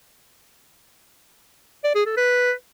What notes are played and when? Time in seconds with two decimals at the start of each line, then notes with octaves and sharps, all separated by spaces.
1.84 D5
1.95 G#4
2.06 A4
2.17 B4